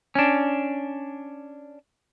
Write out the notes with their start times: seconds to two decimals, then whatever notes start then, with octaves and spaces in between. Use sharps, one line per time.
0.15 C#4 D4